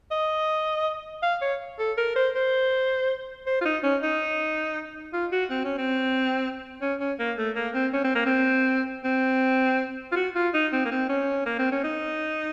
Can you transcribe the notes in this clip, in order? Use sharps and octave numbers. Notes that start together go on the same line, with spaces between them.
D#5
F5
C#5
A4
A#4
C5
C5
C5
F4
D#4
C#4
D#4
F4
F#4
C4
C#4
C4
C#4
C#4
A#3
A3
A#3
C4
C#4
C4
A#3
C4
C4
F4
F#4
F4
D#4
C4
A#3
C4
C#4
A#3
C4
C#4
D#4